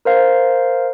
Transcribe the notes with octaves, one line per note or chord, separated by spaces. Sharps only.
A#4 C5 F5